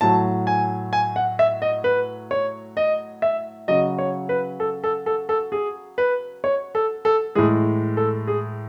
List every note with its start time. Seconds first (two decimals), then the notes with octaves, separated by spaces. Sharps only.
0.01 A2 F#3 A5
0.47 G#5
0.93 G#5
1.16 F#5
1.39 E5
1.62 D#5
1.84 B4
2.31 C#5
2.77 D#5
3.22 E5
3.68 C#3 F#3 D#5
3.99 C#5
4.29 B4
4.60 A4
4.84 A4
5.06 A4
5.29 A4
5.52 G#4
5.98 B4
6.44 C#5
6.75 A4
7.05 A4
7.35 A2 E3 G#3 G#4
7.97 A4
8.27 G#4